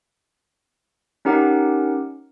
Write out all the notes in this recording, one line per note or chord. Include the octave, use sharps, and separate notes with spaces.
C#4 D#4 G4 A#4 F#5 D6